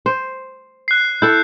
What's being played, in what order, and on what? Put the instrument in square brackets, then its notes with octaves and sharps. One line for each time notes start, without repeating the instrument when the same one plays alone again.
[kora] C5
[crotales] F#6 C7
[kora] E4 A4 [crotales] G6